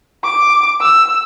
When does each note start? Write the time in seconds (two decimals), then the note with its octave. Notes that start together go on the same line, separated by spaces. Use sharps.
0.24 D6
0.81 E6